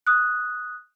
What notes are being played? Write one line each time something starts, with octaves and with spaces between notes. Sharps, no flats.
D#6 F#6